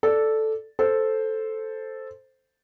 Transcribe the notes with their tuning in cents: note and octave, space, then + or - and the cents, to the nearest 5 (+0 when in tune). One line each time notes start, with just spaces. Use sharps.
A4 +0 D5 +0
A4 +0 C5 +0